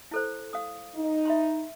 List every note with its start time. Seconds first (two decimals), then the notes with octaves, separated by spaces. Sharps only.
0.11 E4 A4 C5
0.53 F5 D#6
0.94 D#4
1.25 E5 B5 C6